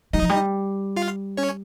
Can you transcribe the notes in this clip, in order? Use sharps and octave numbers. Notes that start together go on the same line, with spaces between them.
G3 D#4 D#5
F3
G3
F4 F5
C#4 C#5